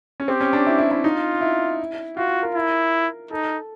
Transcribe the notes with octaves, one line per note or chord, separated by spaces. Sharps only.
C#4
C4 G4
C#4
D4
E4
E4
E4
D#4 F4
E4
F4 F#4
A#4
E4
D#4 A4